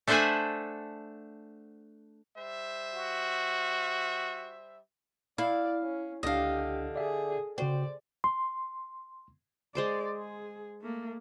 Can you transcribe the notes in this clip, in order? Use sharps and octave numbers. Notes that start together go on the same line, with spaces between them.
A3 D4 C5 E5 F#5 G#5
G3 C5 E5
F#4
E4 D5 F5
C#4
C#2 D3 D4 G4 D#5 F5
G#4 D5 E5
C#3 F#4 C5 D5 G5
C6
G#3 C5 D5 D6
G#4
A3 A#3